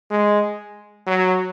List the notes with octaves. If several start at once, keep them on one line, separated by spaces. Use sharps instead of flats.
G#3
F#3